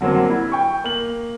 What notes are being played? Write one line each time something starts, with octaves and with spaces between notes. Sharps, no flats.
D3 F#3 A#3 C4
E4
G5 C#6
A#3 F#7